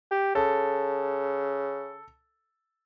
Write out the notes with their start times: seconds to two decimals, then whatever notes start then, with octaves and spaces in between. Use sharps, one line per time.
0.11 G4
0.35 C#3 A4